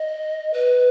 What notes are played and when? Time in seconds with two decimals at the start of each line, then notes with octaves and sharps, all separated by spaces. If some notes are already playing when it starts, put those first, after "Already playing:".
Already playing: D#5
0.54 B4